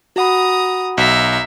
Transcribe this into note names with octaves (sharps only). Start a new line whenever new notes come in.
F#4 F#5 A#5 B5 D#6
B1 E5 A#5